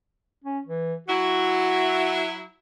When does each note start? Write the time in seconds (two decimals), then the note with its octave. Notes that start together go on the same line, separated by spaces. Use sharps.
0.45 C#4
0.67 E3
1.09 F#3 E4 F#4